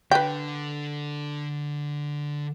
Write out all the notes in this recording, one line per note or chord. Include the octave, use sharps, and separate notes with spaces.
D3 B4 G5